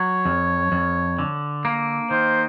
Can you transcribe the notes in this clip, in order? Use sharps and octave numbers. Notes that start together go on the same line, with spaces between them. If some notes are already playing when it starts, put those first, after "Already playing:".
Already playing: F#3 C#5
F2
F2
D3
A#3
D#3 C5